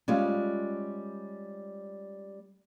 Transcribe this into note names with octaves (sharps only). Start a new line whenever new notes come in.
G3 G#3 C#4 F4